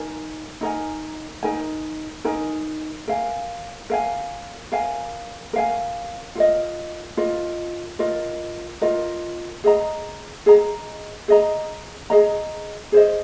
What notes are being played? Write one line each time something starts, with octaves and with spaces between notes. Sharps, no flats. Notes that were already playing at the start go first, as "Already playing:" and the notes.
Already playing: D#4 A#4 G#5
D#4 A#4 G#5
D#4 A#4 G#5
D#4 A#4 G#5
A#4 F5 G#5
A#4 F5 G#5
A#4 F5 G#5
A#4 F5 G#5
F4 A#4 D#5
F4 A#4 D#5
F4 A#4 D#5
F4 A#4 D#5
G#4 D#5 A#5
G#4 D#5 A#5
G#4 D#5 A#5
G#4 D#5 A#5
G#4 C5 D#5